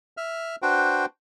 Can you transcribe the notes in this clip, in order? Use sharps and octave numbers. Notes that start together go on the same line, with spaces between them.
E5 F6
D4 F#4 B4 C5 G5